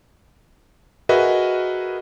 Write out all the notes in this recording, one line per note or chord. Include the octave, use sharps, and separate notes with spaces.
F#4 G#4 A#4 B4 D#5 E5